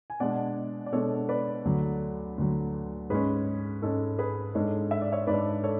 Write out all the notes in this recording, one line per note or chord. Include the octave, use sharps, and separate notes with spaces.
G#5
B2 G#3 D4 D5 F#5
D5
B2 G#3 D4 A4 C#5
B4 D5
D2 D3 F#3
D2 D3 F#3
G#2 G#3 C#4 G#4 B4
G#2 G#3 C#4 A4
G#4 B4
G#2 G#3 D4 A4 C#5
E5
D5
C#5 E5
G#2 G#3 D4 B4 D5
A4 C#5